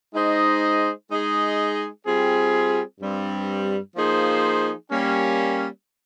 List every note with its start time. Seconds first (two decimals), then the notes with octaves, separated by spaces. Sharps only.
0.13 G#3 D#4 G#4 C5 D#5
1.10 G#3 D#4 G#4 D#5
2.05 G3 C4 F4 G#4
3.01 G2 G3 C4
3.95 F3 A#3 D#4 G#4 C5
4.91 G3 A#3 C#4